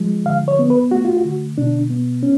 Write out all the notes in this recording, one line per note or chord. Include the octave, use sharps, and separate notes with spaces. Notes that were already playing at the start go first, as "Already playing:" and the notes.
Already playing: F3 G#3
D3 F5
C#5
B3
B4
A3 F#4
F4
F#4
D3
B2 D4
B3
C#4